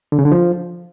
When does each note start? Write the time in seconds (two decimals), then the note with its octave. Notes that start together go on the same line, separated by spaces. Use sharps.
0.12 D3
0.19 C#3
0.25 D3
0.32 F3